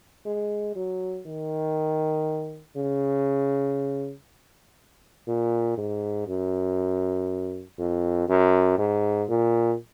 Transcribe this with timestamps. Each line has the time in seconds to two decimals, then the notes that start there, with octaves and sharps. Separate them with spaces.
0.26 G#3
0.76 F#3
1.27 D#3
2.77 C#3
5.28 A#2
5.78 G#2
6.28 F#2
7.79 F2
8.29 F#2
8.79 G#2
9.29 A#2